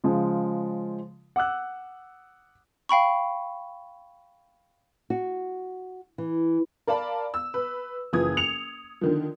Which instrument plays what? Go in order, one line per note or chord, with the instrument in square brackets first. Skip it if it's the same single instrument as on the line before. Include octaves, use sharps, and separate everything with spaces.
[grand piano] C#3 F3 G#3 F4
F#5 D6 E6 F#6
[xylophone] F5 G5 B5 C#6
[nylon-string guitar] F#4
E3
[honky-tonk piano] A#4 D5 F5 A5 B5
E6
B4
F#1 E3 F3 D#6 G#6
C#7 F7
D3 D#3 F3